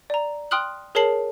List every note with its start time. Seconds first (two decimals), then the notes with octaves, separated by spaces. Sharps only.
0.10 D5 A#5
0.51 G5 C6 D#6 F6 F#6 F#7
0.95 G#4 A#4 C#5 A5 C7 F#7